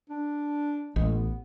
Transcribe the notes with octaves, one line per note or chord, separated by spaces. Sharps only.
D4
A1 G#3
B3